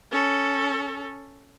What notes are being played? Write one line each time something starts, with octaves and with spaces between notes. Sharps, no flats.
C#4 A4